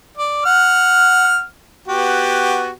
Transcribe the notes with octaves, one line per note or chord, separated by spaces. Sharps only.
D5
F#5 F6
B3 F#4 G4